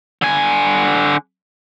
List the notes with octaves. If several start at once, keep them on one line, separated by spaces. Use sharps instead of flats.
D3 G#5